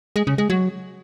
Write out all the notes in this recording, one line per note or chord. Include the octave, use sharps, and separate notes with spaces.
G#3
C#3
G#3
F#3